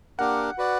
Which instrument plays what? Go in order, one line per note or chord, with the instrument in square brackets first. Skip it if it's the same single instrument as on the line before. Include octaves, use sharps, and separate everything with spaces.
[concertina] A#3 D4 G4 A#4 [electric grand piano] F#5
[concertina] F#4 B4 D5